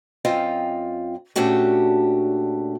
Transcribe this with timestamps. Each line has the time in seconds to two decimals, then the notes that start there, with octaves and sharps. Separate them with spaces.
0.25 F#2 C4 F4 D#5 F5 G5
1.36 A#2 A3 C#4 D4 F#4 G4